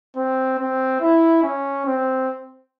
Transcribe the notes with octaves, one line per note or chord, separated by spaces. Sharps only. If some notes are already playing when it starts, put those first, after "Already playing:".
C4
C4
E4
C#4
C4